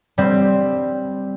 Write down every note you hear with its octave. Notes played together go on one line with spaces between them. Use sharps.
G3 C4